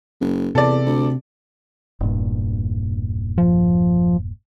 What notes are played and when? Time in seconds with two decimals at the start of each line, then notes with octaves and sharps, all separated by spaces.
0.21 F#1
0.55 E2 C3 A4 D5
0.86 D2
2.00 E1 G2 A#2
3.38 F3